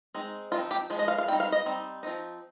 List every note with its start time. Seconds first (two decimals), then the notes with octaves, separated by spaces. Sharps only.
0.14 G#3 C4 D#4
0.52 F3 G#3 C4 D#4 F4
0.71 G4
0.90 F3 G#3
0.99 D#5
1.08 F5
1.18 F5
1.28 G3 C4 D#4 G5
1.40 F5
1.52 D#5
1.66 G3 C4 D#4
2.03 F3 C4 D#4